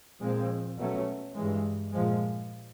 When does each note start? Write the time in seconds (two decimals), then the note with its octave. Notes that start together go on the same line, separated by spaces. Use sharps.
0.20 A#2 F3 G#3 C4
0.77 B2 F#3 A3 C#4
1.34 G2 E3 G#3
1.92 A#2 F3 G#3